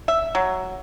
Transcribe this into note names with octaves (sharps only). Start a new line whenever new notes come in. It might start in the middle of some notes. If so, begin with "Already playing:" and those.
E5
F#3